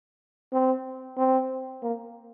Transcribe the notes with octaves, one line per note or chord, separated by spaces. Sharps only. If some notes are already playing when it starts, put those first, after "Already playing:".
C4
C4
A#3